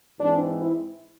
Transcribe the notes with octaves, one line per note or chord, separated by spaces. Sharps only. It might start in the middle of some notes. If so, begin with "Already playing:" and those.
G#2 E3 G#3 C4 D4
E4